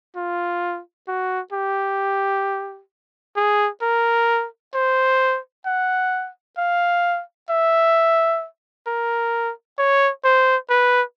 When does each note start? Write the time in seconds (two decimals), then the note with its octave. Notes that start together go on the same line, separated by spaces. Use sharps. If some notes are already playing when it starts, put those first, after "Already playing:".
0.16 F4
1.08 F#4
1.53 G4
3.36 G#4
3.82 A#4
4.74 C5
5.66 F#5
6.57 F5
7.50 E5
8.87 A#4
9.78 C#5
10.24 C5
10.70 B4